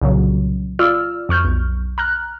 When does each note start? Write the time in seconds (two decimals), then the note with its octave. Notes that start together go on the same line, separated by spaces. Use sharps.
0.01 C2 A#2 C#3 F#3
0.79 F4 D5 E6 F6
1.29 F2 C#6 F6 G6
1.45 B1
1.98 A#5 F6 F#6